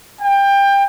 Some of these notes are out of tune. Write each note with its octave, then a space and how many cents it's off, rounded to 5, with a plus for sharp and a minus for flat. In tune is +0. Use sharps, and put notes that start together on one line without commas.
G5 +25